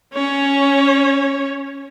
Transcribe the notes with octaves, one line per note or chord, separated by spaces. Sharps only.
C#4 C#5